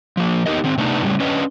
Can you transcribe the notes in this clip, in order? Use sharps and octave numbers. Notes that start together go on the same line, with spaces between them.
F3 A#3
B3 D#4 F#4 G4 A#4 D#5
D#3 C4
C3 A3 B3 C4 D4 D#4
A2 C#3 G3
C#4 D4 B4 D#5